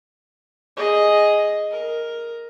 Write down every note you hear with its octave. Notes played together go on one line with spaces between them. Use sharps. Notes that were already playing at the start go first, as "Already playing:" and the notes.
G#4 D#5
A#4